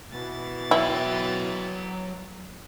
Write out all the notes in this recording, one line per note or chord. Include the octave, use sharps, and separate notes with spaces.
B2 E3 A6
F#3 E4 G5